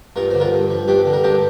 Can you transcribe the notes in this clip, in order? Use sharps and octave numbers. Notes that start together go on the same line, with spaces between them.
G2 F4 A#4
D3 C5
F4 A#4
G2
F3
G2 D4 G4
D3
A#4
G2 D4 G4